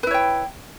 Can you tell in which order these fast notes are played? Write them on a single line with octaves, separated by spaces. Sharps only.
B4 E4 C#5 G5